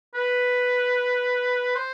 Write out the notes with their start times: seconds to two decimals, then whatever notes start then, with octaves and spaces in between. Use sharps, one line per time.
0.15 B4
1.75 C5